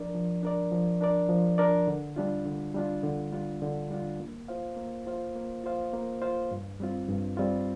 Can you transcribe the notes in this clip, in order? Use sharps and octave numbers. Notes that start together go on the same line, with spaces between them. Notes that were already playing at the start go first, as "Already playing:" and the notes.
Already playing: F3 D4 A#4 D5
F3
D4 A#4 D5
F3
D4 A#4 D5
F3
D4 A#4 D5
D3
G3 D4 F4
D3
G3 D4 F4
D3
G3 D4 F4
D3
G3 D4 F4
A#3
F4 C5 F5
A#3
F4 C5 F5
A#3
F4 C5 F5
A#3
F4 C5 F5
G2
G3 C4 F4
G2
G3 C4 F4